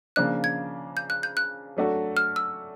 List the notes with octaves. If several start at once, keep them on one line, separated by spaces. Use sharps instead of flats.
C#3 F3 A#3 D4 F#6
G#6
G6
F#6
G6
F#6
F#3 A3 D4 F#4 A4
F6
E6